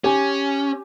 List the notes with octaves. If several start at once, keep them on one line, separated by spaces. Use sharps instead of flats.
C#4 G4 G#5